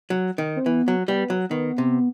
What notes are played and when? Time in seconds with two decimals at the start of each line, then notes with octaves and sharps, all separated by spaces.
0.10 F#3
0.38 D#3
0.56 C4
0.66 E3 B3
0.88 F#3
1.08 G3 B3
1.30 F#3
1.50 D#3 B3
1.78 C3